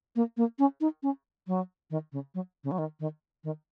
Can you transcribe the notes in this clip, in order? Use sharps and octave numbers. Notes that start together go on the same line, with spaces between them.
A#3
A#3
C#4
D#4
C#4
F#3
D#3
C#3
F#3
C#3
F#3
D#3
D#3
D#3